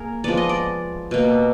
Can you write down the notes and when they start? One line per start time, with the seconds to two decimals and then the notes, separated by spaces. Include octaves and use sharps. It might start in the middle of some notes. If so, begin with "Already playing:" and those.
Already playing: A#3 G#4 A#4
0.24 F3 G#3 B3 D5
0.37 D#5
0.49 D5
1.11 B2 A#3